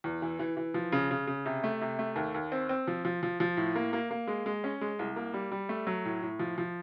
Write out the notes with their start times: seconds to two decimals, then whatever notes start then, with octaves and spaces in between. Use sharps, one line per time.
0.04 E2
0.22 E3
0.39 E3
0.57 E3
0.74 F3
0.92 C#3
1.11 C#3
1.27 C#3
1.46 C3
1.64 A3
1.81 C3
1.99 A3
2.16 D#2
2.34 D#2
2.52 C4
2.69 C4
2.87 F3
3.05 F3
3.23 F3
3.40 F3
3.57 A2
3.76 A#3
3.93 A#3
4.11 A#3
4.27 G#3
4.46 G#3
4.64 C#4
4.81 G#3
4.99 C2
5.16 A#3
5.34 G3
5.52 G3
5.69 A3
5.87 F#3
6.05 A2
6.22 A2
6.39 F3
6.58 F3